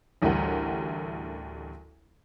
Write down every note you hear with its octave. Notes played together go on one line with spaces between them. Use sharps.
A1 D2 G3 G4 A#4 F#5